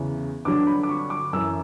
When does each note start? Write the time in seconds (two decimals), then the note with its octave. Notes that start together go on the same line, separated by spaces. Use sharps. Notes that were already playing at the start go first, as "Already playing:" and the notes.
Already playing: E2 C#3 E3
0.45 G2 D3 F#3 D6
0.67 B5
0.83 D6
0.89 C#6
1.10 D6
1.33 F#2 E3 E6